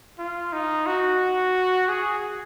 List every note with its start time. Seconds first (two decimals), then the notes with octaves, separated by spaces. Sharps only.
0.19 F4
0.53 D#4
0.86 F#4
1.89 G#4